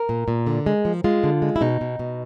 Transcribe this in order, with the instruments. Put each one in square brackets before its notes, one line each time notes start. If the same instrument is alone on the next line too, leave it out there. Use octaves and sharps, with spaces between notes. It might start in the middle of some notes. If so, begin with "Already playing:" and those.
Already playing: [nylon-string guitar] A#4
A#2
A#2
D3
G#3
F3
G#3 F4
D3
G#3
E4
B2 D#4
B2
B2